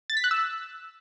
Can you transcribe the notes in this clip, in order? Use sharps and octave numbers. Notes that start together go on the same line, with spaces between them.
A6
B6
F#6
E6